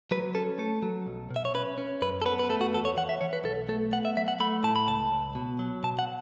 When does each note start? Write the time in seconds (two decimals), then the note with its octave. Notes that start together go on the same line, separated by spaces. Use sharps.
0.11 F#3 B4
0.35 C#4 A4
0.58 A3 A4
0.83 F#3
1.07 B1
1.31 B2
1.36 E5
1.45 C#5
1.54 C#4 B4
1.78 C#4
2.02 F#2 B4
2.22 A4
2.26 B3 B4
2.39 B4
2.49 A3 A4
2.61 F#4
2.73 E2 A4
2.85 C#5
2.97 E3 F#5
3.09 E5
3.21 E3 C#5
3.33 B4
3.45 B1 A4
3.69 A3 A4
3.92 B3 F#5
4.05 E5
4.17 F#3 E5
4.28 F#5
4.40 A3 B5
4.64 A2 A5
4.76 B5
4.87 C#2 A5
5.12 C#2
5.35 B2
5.59 F#3
5.83 B2 A5
5.99 F#5